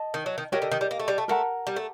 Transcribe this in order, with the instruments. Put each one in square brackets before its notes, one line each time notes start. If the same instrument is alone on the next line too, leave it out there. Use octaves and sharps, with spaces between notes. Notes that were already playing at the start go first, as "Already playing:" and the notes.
Already playing: [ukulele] D#5 A5
[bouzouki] D#3
F#3
D#3
[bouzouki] F#3 [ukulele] G4 A#4 D#5 G5
[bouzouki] D3
D#3
G3
A#3
A3
G3
A3
[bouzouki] A3 [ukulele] A#4 F#5 A#5
[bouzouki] G3
A3